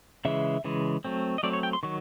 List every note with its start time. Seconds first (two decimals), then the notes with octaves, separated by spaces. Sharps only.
0.25 C#3 E3 G#3 E5
0.64 C#3 E3 G#3
1.05 F#3 A3 C4
1.38 D#5
1.43 F#3 A3 C4 D5
1.53 C#5
1.63 G5
1.73 C6
1.83 D#3 F#3 C#6